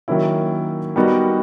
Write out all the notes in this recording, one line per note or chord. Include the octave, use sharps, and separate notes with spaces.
D#3 F#3 A#3 C#4 E4
G3 B3 D#4 F#4 A#4